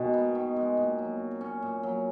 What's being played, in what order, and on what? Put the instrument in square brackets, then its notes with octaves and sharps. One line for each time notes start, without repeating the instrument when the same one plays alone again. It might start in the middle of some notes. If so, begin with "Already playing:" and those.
Already playing: [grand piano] B2 [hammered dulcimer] D#3 G#3
[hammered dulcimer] B3
D#3
G#3
A#2
F#3
F#4
C#4
A#2
F#3